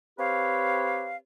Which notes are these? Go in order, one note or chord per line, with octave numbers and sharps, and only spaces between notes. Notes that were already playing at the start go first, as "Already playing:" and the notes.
C4 G4 B4 C#5 F5